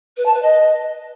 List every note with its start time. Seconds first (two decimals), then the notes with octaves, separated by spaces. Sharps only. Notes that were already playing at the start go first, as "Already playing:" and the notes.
0.17 B4
0.25 A5
0.34 B4
0.42 D#5